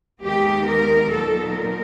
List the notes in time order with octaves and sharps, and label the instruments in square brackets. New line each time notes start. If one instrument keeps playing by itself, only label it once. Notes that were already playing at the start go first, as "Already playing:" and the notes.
[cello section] D#2 D#3 G#3 B3 D#4 G4
A#4
A#2 F#3 B3 D#4 A4
A#4